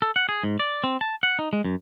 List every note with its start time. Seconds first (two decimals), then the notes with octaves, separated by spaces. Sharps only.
0.02 A4
0.16 F#5
0.29 G#4
0.43 G#2
0.59 D5
0.84 C4
1.01 A5
1.23 F#5
1.39 D#4
1.53 G#3
1.64 F#2